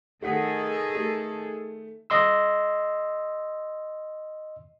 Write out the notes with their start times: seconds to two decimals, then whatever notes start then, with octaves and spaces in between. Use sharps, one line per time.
0.22 D#3 A3 G#4 A4 F#5 B6
0.95 A3
2.10 D#5 C6 E6